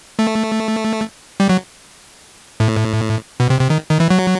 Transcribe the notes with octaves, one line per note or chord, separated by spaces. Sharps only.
A3
G3
F#3
A2
B2
C3
C3
D#3
D#3
E3
F#3